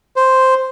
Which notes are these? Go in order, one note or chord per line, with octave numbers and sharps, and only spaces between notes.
C5